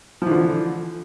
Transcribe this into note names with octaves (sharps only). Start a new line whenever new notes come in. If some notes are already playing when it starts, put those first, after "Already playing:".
D3 E3 F3